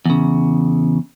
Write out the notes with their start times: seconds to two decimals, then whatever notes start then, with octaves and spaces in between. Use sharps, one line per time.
0.06 E2 C#3